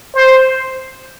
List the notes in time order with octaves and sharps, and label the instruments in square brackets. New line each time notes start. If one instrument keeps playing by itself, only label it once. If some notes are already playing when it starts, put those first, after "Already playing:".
[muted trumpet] C5